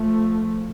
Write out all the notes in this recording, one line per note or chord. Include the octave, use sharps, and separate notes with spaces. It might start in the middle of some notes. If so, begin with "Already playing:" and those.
Already playing: F3 A3